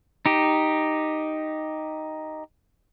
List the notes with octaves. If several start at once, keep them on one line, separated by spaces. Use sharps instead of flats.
D#4 G4